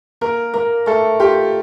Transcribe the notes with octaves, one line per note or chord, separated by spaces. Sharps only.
A#3 A#4
A#3 A#4
A3 A4
F4 G4